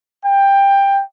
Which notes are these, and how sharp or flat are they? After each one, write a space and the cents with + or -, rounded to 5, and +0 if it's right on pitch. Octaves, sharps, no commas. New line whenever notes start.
G5 +15